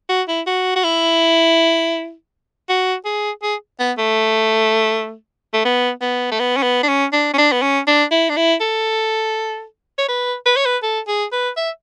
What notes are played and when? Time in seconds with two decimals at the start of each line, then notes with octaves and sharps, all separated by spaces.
0.10 F#4
0.29 E4
0.47 F#4
0.76 F#4
0.84 E4
2.69 F#4
3.05 G#4
3.43 G#4
3.80 B3
3.98 A3
5.54 A3
5.65 B3
6.02 B3
6.32 A3
6.40 B3
6.57 C#4
6.63 B3
6.83 D4
6.88 C#4
7.13 D4
7.34 C#4
7.38 D4
7.52 B3
7.62 C#4
7.87 D4
8.12 E4
8.29 D4
8.37 E4
8.61 A4
9.99 C#5
10.09 B4
10.46 B4
10.57 C#5
10.66 B4
10.83 A4
11.08 G#4
11.33 B4
11.57 E5